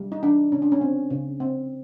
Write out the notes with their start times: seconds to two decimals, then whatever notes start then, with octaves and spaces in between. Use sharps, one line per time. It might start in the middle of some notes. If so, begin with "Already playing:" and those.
Already playing: G3
0.12 D#4
0.22 E3 D4
0.52 C#3 C#4
0.62 D4
0.72 C#4
0.81 C4
1.10 C#3
1.40 C4